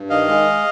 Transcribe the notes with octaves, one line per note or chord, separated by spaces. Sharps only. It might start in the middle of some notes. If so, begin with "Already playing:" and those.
Already playing: G2
D#3 D#5 F5
G#3